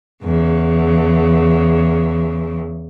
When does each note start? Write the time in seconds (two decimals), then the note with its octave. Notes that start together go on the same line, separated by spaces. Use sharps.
0.23 E2 C#3